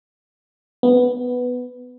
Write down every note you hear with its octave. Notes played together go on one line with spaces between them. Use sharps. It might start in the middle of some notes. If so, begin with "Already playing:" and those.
B3